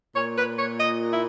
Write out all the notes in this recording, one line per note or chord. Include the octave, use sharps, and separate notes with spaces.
A#2 C#5
B4
C#5
D#5
E4